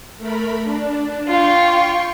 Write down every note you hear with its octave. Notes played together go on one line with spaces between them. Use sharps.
A3 A#4 B5
D4
F4 G5 C6 C#6